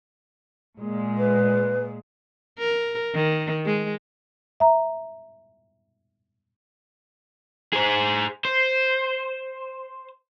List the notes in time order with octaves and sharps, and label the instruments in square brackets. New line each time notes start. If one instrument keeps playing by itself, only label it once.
[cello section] A#2 G#3
[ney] B4
[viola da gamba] A#4
D#3
G#3
[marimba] E5 A#5
[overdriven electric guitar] G#4 C5
C5